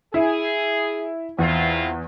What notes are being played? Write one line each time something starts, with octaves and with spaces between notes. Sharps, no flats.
E4 G#4
E2 C4 E4 F4